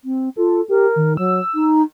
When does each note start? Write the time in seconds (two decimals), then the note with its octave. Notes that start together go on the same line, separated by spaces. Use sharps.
0.04 C4
0.36 F4 A4
0.69 G4 A#4
0.96 D#3
1.17 F#3 E6
1.54 D#4